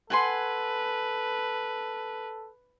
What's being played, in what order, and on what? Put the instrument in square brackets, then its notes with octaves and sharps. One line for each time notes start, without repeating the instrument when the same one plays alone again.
[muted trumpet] A4 [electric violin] B4 [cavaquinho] F#5 G#5 C6